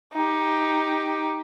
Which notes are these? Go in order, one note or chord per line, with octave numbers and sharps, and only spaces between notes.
D#4 G4